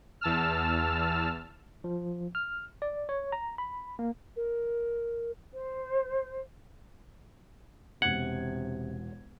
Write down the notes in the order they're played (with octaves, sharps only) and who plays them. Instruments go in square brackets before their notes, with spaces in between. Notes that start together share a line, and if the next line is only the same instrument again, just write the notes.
[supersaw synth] E2 A5 E6 F6
[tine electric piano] F3
F6
D5
C#5
A#5
B5
A#3
[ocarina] A#4
[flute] C5
[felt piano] E1 G#6 [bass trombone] C3 [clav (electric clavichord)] F#5